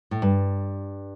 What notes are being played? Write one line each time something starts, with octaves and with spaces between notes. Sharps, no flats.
A2
G2